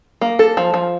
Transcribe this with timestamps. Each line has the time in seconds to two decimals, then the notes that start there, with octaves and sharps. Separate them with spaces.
0.21 A#3
0.39 A4
0.57 F3
0.74 F3